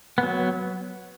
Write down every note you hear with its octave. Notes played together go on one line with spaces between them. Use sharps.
B3
F#3